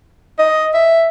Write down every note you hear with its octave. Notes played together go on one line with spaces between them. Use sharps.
D#5
E5